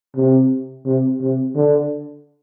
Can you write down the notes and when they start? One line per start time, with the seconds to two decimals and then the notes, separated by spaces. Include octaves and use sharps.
0.16 C3
0.85 C3
1.21 C3
1.55 D3